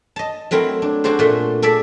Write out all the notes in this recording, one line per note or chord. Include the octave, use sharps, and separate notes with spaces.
D#5 A5
F#3 A3 C4 E4 A#4
D4
D4 F#4 G#4 A4 C5
A#2 A3 C6
G#4 A4 D5 E5